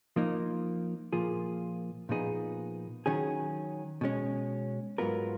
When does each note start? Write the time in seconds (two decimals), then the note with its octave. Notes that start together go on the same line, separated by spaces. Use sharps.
0.16 F3 A#3 D#4
1.13 A#2 F3 A#3 F4 G#4
2.09 A#2 F3 B3 D#4 G#4
3.06 D#3 F#3 C#4 G#4
4.01 B2 G#3 C#4
4.98 G#2 F#3 B3 F4 A#4